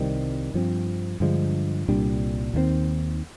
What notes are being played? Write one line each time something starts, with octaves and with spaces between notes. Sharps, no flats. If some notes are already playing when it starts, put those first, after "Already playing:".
Already playing: C2 C3 D#3 G3
G2 F3 C4
G2 D3 F3 G#3
C2 A#2 G3 D4
D#2 D#3 G#3 C4